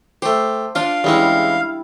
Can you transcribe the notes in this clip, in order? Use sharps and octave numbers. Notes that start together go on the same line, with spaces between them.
A3 G4 C5
D4 F4 F5 D6
E2 G3 G#3 C#4 E4